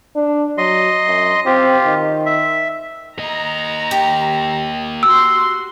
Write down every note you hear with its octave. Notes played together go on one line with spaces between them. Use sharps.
D4
F#3 D#5 C6
F#2
C4 F4 G4
D#3
E5
A#3 D#5 A#5
G4
F#4 C6 E6